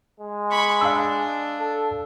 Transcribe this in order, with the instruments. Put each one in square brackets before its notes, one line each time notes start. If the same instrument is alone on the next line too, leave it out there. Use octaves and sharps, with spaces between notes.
[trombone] G#3
[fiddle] B5 C#6
[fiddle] D4 [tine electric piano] F5 A5 E6
[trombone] A4